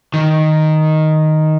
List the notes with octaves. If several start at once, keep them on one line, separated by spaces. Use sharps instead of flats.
D#3